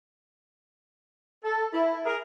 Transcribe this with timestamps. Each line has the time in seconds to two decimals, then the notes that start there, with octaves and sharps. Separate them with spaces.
1.44 A4
1.74 E4
2.06 G#4 A#4